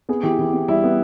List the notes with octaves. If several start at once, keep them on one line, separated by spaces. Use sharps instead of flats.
B3 G#4
E3 G4
E3
B3
G3 E4
B3